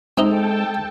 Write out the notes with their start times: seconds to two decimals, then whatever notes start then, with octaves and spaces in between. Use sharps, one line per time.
0.18 G#3 C4 D#4 A4 D#5 G5 A5